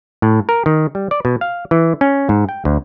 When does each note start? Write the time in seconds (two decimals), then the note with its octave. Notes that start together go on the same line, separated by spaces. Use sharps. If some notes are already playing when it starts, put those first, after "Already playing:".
0.22 A2
0.49 A#4
0.66 D#3
0.95 G3
1.11 D5
1.25 B2
1.41 F5
1.71 E3
2.01 C#4
2.29 G#2
2.49 G5
2.65 D2